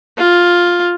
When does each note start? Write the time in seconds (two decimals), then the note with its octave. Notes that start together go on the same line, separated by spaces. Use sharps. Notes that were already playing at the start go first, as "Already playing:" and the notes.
0.18 F4